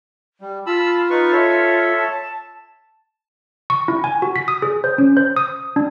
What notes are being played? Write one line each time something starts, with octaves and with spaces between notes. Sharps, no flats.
G3
F4 A5 B5 E6
D#4 B4 C#6
A4 C#5 E5
A5
C#6
E4
G#5
F#4
B6
D#6
G#4
C5
C#4
C5
D#6
D4